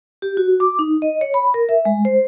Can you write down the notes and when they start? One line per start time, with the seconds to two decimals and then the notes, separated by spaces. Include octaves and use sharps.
0.22 G4
0.37 F#4
0.60 D6
0.79 D#4
1.02 D#5
1.21 C#5
1.34 B5
1.54 A#4
1.69 E5
1.85 G#3
2.05 C5